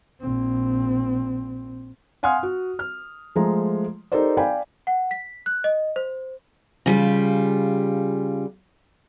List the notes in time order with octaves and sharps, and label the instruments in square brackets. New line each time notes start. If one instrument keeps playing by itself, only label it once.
[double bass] A#1 C4
[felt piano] F5 F#5 G#5 C6 D#6 F6
F#4
F6
F3 G#3 A3 A#5
D#4 G4 A4 A#4 C5 D5
D5 F5 G5 G#5 B5
[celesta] F#5
B6
F#6
D#5
C5
[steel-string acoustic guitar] C#3 G3 F4